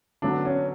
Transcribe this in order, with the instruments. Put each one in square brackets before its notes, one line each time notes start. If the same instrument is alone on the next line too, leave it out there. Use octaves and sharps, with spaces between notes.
[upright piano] D3 F#3 B3 F#4 [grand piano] D4
[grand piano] C#4